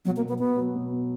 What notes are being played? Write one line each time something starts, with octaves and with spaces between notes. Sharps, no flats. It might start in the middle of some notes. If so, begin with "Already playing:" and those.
B2 F#3
A#3
B2
B3
B2 B3
F#3
B2
B3